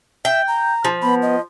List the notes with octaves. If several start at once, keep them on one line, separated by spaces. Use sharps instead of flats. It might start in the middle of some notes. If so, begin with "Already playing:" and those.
E5 G5
A#5
F3
B3 B5
D#5